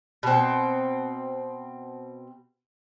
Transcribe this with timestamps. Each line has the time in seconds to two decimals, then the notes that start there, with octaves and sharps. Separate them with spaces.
0.23 B2 C4